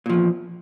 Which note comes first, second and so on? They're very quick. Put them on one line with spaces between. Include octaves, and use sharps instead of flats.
A#2 F3 E2